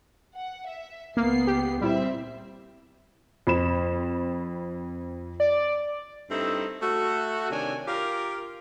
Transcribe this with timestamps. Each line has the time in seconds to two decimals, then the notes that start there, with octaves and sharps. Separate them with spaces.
0.35 F#5
0.68 E5
1.17 C#2 A#3 B3 C7
1.47 G4
1.81 A#2 G3 C4 E4 E5
3.47 F2 B5 E7
5.40 D5
6.30 G2 A3 C4 D#4 E4
6.82 A3 F#4
7.50 C3 D#3 D4 C#5 G#5
7.87 F4 G4 A#4